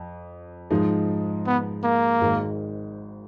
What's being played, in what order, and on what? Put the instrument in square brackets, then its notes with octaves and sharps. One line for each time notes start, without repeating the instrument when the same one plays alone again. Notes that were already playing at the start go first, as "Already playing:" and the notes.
Already playing: [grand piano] F2
G#2 F3 G#3 D#4
[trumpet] B3
A#3
[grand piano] G#1 G#2 D#3 G#3